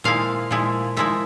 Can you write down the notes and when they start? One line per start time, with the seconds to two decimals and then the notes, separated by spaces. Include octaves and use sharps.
0.04 A#2 F3 G#3 E4 F5
0.51 A#2 F3 G#3 E4
0.96 A#2 F3 G#3 E4 E5